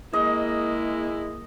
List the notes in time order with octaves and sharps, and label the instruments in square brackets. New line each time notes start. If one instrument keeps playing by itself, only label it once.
[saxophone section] G#3 E4 [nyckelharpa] A#3 [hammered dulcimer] D#5